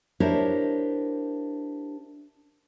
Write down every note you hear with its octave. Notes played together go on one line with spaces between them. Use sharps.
D4 E4 G4 A#4 C5 C#5